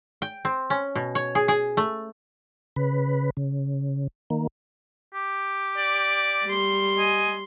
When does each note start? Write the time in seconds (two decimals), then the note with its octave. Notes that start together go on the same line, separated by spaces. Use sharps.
0.22 G5
0.45 C4
0.70 C#4
0.96 B2
1.15 C#5
1.35 G#4
1.48 G#4
1.77 A3
2.76 C#3 B4
3.37 C#3
4.30 D#3 A#3
5.14 G4
5.77 D5
6.45 G3 C6
6.98 D#5 G#5